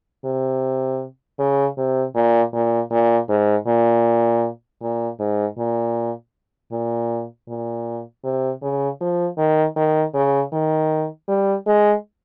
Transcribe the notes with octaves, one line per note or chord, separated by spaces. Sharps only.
C3
C#3
C3
A#2
A#2
A#2
G#2
A#2
A#2
G#2
A#2
A#2
A#2
C3
C#3
F3
D#3
D#3
C#3
D#3
G3
G#3